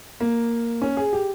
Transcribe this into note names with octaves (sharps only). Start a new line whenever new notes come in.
A#3
C#4
G#4
G4